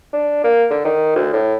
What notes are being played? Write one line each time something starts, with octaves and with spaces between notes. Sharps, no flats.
D4
A#3
D3
D#3
D2
A2